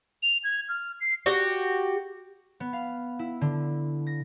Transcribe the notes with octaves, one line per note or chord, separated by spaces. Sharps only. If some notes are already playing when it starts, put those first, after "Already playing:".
F7
G#6
F6
C7
F#4 G4
B3
F5
E4
D3
A#6